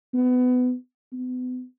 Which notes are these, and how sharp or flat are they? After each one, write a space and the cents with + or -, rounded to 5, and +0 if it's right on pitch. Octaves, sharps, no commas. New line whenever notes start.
B3 +25
B3 +35